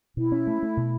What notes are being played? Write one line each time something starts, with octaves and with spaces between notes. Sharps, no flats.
B2 E4
C#4
A3
A3
B2